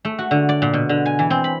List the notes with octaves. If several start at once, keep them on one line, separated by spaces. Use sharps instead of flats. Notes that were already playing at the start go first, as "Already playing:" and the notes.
A3
F#4
D3
D5
A#2
B2
D3
G#5
E3
C4
B5